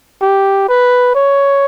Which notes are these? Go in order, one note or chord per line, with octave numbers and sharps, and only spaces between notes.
G4
B4
C#5